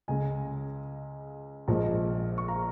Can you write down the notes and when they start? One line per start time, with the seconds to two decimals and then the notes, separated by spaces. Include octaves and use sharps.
0.08 C#2 C#3 G#3 D#5 G#5
1.68 A#1 A#2 F3 G#3
2.38 C#6
2.48 F5 A#5